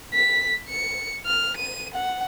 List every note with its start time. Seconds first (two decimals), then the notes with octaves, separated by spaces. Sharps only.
0.14 B6
0.70 C#7
1.26 F6
1.57 D#7
1.94 F#5